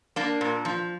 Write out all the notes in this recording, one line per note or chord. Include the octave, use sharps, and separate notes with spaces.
A#3 D4
A#2
F3